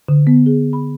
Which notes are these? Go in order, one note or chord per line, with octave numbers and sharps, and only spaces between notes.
D3
B3
G#4
B5